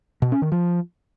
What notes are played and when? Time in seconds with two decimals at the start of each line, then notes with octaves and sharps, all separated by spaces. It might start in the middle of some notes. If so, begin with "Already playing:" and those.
0.22 B2
0.32 C#4
0.42 D#3
0.52 F3